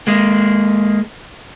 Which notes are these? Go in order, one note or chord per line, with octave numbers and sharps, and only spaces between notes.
G#3 A#3